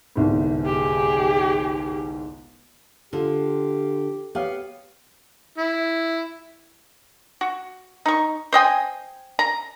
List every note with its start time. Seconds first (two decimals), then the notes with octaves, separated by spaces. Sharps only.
0.16 G1 C2 G#2
0.65 G4 G#4
3.13 D3 F4 G4
4.35 B3 G4 C#5 F5
5.58 E4
7.41 F#4
8.06 D#4 C#6
8.53 C5 D#5 G5 G#5
9.39 A#5